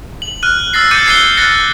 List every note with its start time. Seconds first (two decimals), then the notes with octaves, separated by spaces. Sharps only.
0.22 F#7
0.43 F6 F#6 D#7
0.73 E6 F6 A6 A#6 C7
0.91 D6 G6 A6 C#7 D#7
1.06 G#6 C7 D#7 G7
1.37 F6 F#6 A6 A#6 C#7